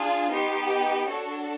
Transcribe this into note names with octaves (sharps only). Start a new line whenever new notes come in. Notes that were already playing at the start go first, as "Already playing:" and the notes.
Already playing: D4 F4 G#4
B3 D#4 G4 C6
G5
D4 F#4 A4 C#5